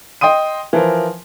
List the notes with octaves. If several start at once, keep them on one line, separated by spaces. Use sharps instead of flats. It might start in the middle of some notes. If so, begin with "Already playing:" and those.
D#5 G5 C6 D#6 D#7
E3 F3 A#4